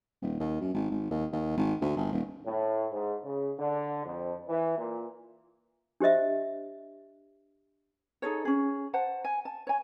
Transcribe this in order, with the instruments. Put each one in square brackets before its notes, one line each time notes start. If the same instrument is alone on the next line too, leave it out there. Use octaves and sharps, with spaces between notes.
[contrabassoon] D#1
D#2
F#2
G#1
G#1
D#2
D#2
G#1
D2
G1
D#1
[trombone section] A2
G#2
C#3
D3
F2
E3
A#2
[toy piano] D4 G4 C5 D#5 E5
[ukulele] D#4 G#4 A4 C#5
C#4 G#4
C5 F#5 A5
G#5
A5
C#5 G#5